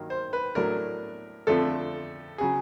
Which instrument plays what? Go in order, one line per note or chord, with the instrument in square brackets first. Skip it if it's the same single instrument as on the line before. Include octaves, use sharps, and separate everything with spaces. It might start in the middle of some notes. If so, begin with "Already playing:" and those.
Already playing: [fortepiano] G2 D#3 F#3 A#3
[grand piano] C5
B4
[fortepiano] A2 F#3 A3 D4 [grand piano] A#4
[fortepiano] F2 D3 F3 A3 D4 [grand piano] A4
[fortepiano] C#3 F#3 [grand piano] G#4